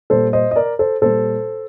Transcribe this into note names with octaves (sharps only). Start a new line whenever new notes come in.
A#2 G3 A4 C5
C5 D#5
D#5
A#4 D5
A4 C5
A#2 G3 A4 C5